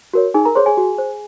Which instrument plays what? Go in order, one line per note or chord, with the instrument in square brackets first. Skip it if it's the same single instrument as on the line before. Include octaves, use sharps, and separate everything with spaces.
[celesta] F#4 A#4 C#5
D#4 G#4 G#5
A#4 A#5
G#4 C5 C#5 C6
G#4 G#5
F#4
C5